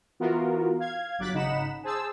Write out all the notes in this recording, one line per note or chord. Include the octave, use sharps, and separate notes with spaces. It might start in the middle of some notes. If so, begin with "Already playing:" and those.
E3 B3 F4 F#4 A#4
F5 G#6
G1 F#3 D6 F#6 A6 B6
G#1 C#3 D#4 F#5 B5 E7
G#4 C5 A5 E6